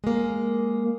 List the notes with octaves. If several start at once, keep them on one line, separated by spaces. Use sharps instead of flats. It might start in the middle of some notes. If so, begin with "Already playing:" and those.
G#3 A#3